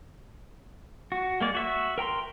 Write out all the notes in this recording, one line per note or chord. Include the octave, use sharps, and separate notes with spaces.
F#4
G#3 A#3 D5
F#4 E5 C#6
A#4 G5 A#5 C6